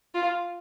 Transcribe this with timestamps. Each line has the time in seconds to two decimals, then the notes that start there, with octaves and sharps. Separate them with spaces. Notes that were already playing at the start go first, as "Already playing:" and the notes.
0.15 F4